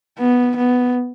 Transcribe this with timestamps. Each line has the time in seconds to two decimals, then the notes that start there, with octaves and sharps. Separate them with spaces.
0.19 B3
0.57 B3